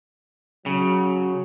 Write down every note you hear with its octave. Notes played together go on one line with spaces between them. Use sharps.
C#3 F#3